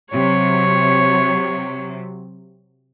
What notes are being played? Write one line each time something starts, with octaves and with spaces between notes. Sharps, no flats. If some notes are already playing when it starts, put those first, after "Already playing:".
C3 F#3 C#5